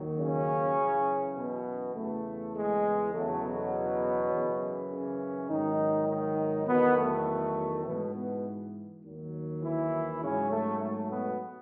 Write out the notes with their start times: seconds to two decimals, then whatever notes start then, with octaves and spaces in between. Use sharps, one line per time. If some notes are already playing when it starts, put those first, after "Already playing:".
Already playing: D#2 D#3 F#3
0.17 C#3 C#4
0.77 F#2 E3
1.35 B2 B3
1.94 E2 C#3 E3 A3
2.54 G#3
3.13 E2 C#3 F#3 A3
3.42 B2 B3
4.30 F#2 C#3 E3
4.89 C#3 C#4
5.48 G#2 D#3 F#3 D#4
6.07 D#3 D#4
6.66 E2 B2 D#3 F#3 B3
6.96 A3
7.84 G#2 B2 E3 B3
8.14 B2 B3
9.03 D#2 D#3 F#3
9.61 E3 E4
10.20 G#2 C#3 F#3 C#4
10.50 A3
10.79 A3
11.09 B2 B3